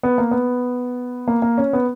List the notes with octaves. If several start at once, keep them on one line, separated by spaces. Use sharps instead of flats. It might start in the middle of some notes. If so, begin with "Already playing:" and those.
B3
A#3
B3
A#3
A#3
C#4
B3